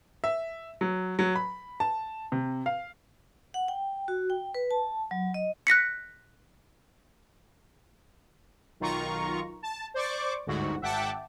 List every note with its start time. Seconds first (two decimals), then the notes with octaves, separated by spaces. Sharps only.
0.24 E5
0.81 F#3
1.19 F#3
1.35 B5
1.80 A5
2.32 C3
2.66 F5
3.54 F#5
3.68 G5
4.08 F#4
4.30 G5
4.55 B4
4.71 A5
5.11 F#3
5.34 D#5
5.67 F#6 A#6 B6 C#7
8.80 B1 D#3 F4 A#5 C#6
9.62 A5
9.94 C5 D5 C#6 D6
10.47 G1 D2 G#2 F#4
10.81 G#1 E5 F#5 G5 A5 D6